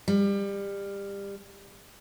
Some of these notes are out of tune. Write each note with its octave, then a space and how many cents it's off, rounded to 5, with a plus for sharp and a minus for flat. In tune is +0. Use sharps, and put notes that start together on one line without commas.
G3 +25